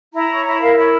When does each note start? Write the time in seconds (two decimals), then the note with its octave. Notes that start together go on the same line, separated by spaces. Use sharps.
0.13 E4 A#5
0.29 C#5
0.44 E4 A#5
0.61 A#4 F5
0.76 E4 C#5